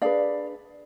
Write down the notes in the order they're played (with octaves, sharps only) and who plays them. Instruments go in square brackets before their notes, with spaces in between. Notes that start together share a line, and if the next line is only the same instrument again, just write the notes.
[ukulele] D4 G#4 B4 D5 F5